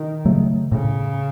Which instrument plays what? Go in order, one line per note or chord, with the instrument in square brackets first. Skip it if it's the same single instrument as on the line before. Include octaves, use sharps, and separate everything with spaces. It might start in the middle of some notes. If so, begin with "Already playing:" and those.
Already playing: [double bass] D#3
[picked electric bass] C#3 F#3 A3
[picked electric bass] A2 [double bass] C#3